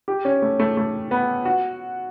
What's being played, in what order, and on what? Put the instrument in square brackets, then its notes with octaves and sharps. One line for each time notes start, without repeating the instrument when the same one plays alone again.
[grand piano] G4
C#4
A3
A3
A3
B3
F#4